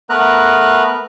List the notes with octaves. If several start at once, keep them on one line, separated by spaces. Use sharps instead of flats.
A3 B3 A#4 B4 A#5 F#6